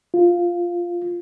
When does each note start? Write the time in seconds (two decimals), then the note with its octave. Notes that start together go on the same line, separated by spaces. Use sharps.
0.14 F4